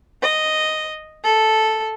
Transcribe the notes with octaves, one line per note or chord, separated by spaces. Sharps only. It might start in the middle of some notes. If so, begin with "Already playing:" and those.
D#5
A4